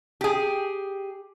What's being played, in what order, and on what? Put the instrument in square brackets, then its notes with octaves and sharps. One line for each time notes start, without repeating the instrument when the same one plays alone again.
[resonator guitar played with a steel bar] G4 G#4